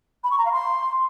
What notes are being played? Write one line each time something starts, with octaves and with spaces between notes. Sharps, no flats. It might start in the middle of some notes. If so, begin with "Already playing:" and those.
B5
C#6
A#5
F5
C6